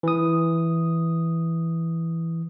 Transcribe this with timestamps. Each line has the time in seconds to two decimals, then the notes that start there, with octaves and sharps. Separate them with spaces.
0.03 E3 D#6